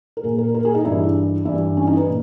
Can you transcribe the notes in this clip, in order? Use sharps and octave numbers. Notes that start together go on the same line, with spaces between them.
A#4
A#2 G#4
A#4
A#4
G#4
D#4
G2 E3 E4
G2 E3 E4
C#4
D#4
B4
A#2